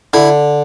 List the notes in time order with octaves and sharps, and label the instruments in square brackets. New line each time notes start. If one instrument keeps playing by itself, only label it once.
[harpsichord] D3 E4